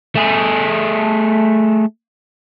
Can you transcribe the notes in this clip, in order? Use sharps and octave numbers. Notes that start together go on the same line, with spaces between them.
A3 G#4